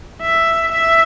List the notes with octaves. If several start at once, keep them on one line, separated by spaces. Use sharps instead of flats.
E5
E5